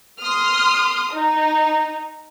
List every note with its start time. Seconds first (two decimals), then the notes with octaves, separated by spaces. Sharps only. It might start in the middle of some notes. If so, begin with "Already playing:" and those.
0.20 C6 D#6 F6
1.09 D#4